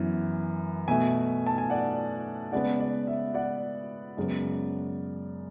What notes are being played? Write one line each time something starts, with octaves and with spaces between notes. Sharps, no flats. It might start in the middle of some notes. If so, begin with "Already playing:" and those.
Already playing: F#2 E3 B3
B2 A3 E5 G#5
A5
G#5
D5 F#5
C#3 G#3 B3 D5 F#5
D5
E5
D5 F#5
F#2 C#3 G#3 B3